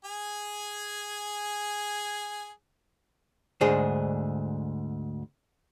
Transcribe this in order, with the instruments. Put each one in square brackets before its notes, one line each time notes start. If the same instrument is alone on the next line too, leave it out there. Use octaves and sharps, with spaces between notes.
[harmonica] G#4 G#5
[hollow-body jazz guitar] D2 G#2 D4 G#4 C5